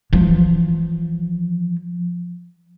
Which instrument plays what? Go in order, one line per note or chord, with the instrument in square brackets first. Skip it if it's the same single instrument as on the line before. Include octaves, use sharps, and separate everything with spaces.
[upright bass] E3 F3